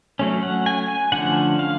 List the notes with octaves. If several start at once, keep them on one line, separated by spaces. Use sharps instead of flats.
F#3 A3 C#4
F#5
G#5
G#5
D3 F3 A3 C#4 F#5
F5